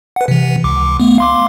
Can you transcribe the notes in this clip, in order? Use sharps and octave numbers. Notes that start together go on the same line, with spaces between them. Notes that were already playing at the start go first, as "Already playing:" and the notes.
B4 F#5
C3 E3
C#2 D6
A3 B3
F5 C6 D6